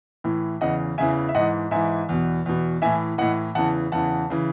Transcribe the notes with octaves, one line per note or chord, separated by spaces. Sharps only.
A2 E3
E2 C#3 E3 D#5 F#5
E2 C#3 E3 E5 G#5
E5
G#2 E3 D#5 F#5
G#2 E3 E5 G#5
E2 B2
E2 B2
A2 E3 E5 G#5
A2 E3 D#5 F#5
E2 C#3 E3 F#5 A5
E2 C#3 E3 F#5 A5
C#3 E3